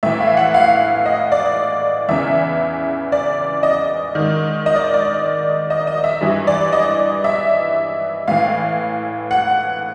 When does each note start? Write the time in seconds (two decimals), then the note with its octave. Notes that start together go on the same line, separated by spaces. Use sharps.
0.03 A2 E3 E5
0.20 F5
0.37 F#5
0.54 F5
1.06 D#5
1.32 D5
2.09 E2 C#3 E3 E5
3.12 D5
3.63 D#5
4.15 G#2 D#3
4.66 D#5
4.76 D5
4.94 D5
5.70 D#5
5.87 D#5
6.04 E5
6.21 G2 E3
6.47 D5
6.73 D#5
7.24 E5
8.28 A2 E3 F5
9.31 F#5